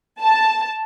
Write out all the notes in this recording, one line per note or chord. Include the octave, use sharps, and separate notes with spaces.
A5